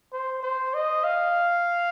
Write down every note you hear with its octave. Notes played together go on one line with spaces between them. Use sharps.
C5
C5
D#5
F5